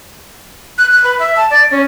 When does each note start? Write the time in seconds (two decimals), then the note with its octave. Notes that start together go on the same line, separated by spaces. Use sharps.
0.78 F#6
0.91 F#6
1.04 B4
1.19 E5
1.36 A5
1.50 D5
1.71 C#4